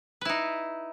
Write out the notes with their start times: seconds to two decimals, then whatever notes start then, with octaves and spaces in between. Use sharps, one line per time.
0.21 B4
0.25 E4
0.29 D#4